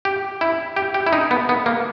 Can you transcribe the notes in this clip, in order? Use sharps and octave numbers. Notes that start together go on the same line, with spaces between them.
G4
E4
G4
G4
E4
D#4
B3
B3
A#3